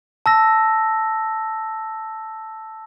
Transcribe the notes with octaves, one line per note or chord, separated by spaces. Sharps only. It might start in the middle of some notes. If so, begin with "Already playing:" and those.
A5 E6 A#6